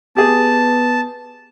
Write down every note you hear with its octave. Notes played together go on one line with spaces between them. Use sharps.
B3 G4 G#4 A5